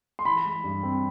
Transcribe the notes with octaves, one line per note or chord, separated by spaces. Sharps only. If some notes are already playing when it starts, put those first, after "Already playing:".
C6
E3 B5
G#3
G2
C4